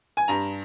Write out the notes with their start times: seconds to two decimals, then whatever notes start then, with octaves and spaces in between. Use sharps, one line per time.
0.17 G#5
0.28 G2 A#5